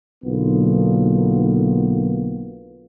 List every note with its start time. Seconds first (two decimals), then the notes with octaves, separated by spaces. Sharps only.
0.24 B1 D3 A#3 B3 F4